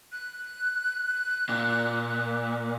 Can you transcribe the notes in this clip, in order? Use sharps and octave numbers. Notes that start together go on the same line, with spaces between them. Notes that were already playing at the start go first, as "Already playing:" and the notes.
F#6
A#2